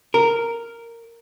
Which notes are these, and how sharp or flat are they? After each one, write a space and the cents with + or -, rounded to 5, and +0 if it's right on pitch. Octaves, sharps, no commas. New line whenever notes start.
A#4 -5